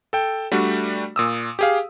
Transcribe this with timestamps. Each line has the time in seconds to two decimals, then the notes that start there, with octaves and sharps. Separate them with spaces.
0.13 A4 G5
0.52 G3 A3 D4 F#4
1.16 A#2 D#6 E6
1.59 G4 G#4 F5